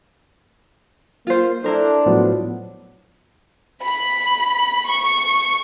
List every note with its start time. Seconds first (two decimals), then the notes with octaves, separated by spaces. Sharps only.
1.27 A#3 F4 C5
1.64 D4 E4 A4 A#4 C5
2.06 A2 F3 F#3 B3
3.83 B5
4.88 C#6